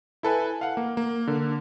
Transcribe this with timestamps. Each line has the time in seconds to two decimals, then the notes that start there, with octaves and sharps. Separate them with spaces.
0.23 E4 A4 B4 G#5
0.61 F5 F#5
0.77 A#3
0.97 A#3
1.27 D3 A#3